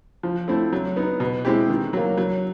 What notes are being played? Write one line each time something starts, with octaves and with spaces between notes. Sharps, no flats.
F3
A3 C4 E4
F#3
B3 D#4
B2
G#3 C4 E4 G4
D#3
F#3 A#3
F#3